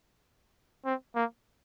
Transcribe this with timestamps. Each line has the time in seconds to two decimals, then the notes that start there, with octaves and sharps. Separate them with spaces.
0.85 C4
1.15 A#3